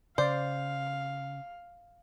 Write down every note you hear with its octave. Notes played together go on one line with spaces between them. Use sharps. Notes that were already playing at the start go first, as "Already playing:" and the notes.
C#3 C5 D5 F5